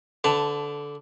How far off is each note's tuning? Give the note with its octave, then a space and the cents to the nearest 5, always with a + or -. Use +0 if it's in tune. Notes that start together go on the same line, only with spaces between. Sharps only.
D3 -15 B4 +25 A5 +0